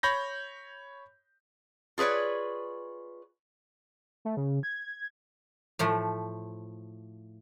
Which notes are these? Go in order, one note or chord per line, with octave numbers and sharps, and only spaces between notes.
C#5 B5 G6 A#6
F4 G#4 B4 C#5 D5
A3
C#3
G#6
A2 F3 A3